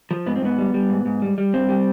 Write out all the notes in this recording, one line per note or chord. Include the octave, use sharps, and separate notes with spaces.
F3
G#2 B3
C4
G#2 B3
G3
G3
G#2
G#2
G3
G3
G2 C4
G3